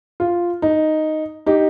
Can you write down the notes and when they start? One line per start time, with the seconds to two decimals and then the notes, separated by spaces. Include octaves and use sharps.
0.20 F4
0.62 D#4
1.46 D#4 G4